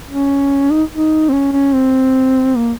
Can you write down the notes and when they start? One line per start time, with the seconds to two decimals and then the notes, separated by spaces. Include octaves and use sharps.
0.09 C#4
0.71 D#4
0.94 D#4
1.29 C4
1.33 C#4
1.53 C#4
1.74 C4
2.56 A#3